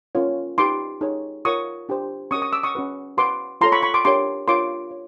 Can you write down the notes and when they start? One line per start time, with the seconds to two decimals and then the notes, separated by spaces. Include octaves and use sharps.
0.15 C#4 F4 A#4 C#5
0.58 D#4 G4 B4 C6 D6
1.01 D#4 G#4 C#5
1.45 F4 A#4 C#5 C#6 D#6
1.89 D4 G4 C5
2.31 C#4 F#4 A#4 C#6 D#6
2.42 C#6 D#6
2.53 D6 E6
2.63 C#6 D#6
2.75 C#4 F#4 B4
3.18 F#4 B4 C6 D6
3.61 F4 A4 C#5 A#5 C6
3.72 B5 C#6
3.83 B5 C#6
3.94 C6 D6
4.05 D4 G4 A#4 C#5 C6 D6
4.48 D4 F4 A#4 C#5 C6 D6
4.91 C#5